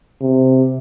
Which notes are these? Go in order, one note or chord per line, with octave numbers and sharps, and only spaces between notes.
C3